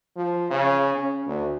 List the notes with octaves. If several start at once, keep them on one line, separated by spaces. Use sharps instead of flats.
F3
C#3
C#4
D2